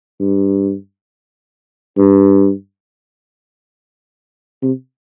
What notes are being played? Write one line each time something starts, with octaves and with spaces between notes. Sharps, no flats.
G2
G2
C3